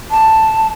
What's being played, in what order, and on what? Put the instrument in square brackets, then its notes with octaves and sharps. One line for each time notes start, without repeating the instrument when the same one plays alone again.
[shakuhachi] A5